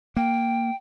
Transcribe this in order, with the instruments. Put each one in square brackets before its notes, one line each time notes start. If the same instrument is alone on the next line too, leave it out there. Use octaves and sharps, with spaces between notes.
[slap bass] A#3 [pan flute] G5